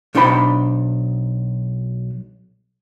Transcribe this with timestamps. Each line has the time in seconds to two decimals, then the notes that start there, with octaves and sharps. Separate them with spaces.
0.15 B1 D4 D#4 C5 G5 B5